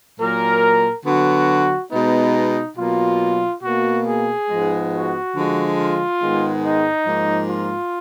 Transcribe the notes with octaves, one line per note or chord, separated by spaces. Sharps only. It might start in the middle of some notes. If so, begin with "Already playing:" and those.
A#2 F#3 A#3 A#4
D3 F#3 B3 F#4
B2 G#3 B3 D#4
B2 F#3 A#3 F4
B2 A#3 F#4
G#4
G#2 F3 G#3 B3
F#4
D3 F3 G#3
F4
G#2 D#3 G#3 B3
D#4
G#2 F3 A#3
F4